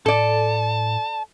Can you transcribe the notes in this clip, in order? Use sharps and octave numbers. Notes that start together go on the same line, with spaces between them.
A2 A4 D5 A5